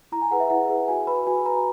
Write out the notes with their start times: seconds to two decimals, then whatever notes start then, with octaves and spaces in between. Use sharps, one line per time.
0.12 E4 A#5
0.22 G#5
0.31 G#4 B4 F#5
0.40 E5
0.50 E4 F#5
0.69 G#4 B4
0.88 F#4 G#5
1.07 B4 B5
1.27 F#4 G#5
1.46 B4 A#5